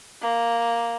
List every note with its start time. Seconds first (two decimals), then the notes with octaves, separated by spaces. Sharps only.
0.22 A#3